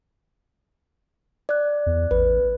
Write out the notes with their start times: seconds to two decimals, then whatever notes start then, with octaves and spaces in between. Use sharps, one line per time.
1.49 D5 F#6
1.86 E2
2.11 A1 B4